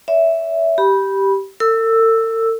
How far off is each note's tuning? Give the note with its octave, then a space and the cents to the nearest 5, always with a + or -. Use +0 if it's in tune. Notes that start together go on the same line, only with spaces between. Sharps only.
C#5 +40 E5 +0
G4 -10 B5 -15
A4 +45 E6 +0